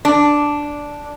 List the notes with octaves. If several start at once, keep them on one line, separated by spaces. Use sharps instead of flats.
D4